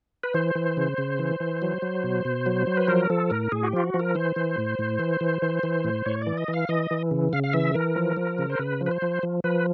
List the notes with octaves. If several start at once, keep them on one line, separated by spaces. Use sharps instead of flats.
B4
E3 C5
E3
C#3
C#3
E3
E3
F#3
F#3
B2
B2
F#3
F#3
B4
F3 A#4
F3 A4
A2 A#4
A2 G#4
F#4
G4
F3 F4
F#4
F3
A#4
E3 C5
E3
A2
A2
E3
E3
E3
E3
A2
A2 C#5
E3 D5
D#5
E3
F5
E3 D#5
E3
C#3
C#3 F5
F5
E3 E5
E3 A#4
F3
F3
C#3
C5
C#3 B4
F3
B4
C5
F3
F3
F3 B4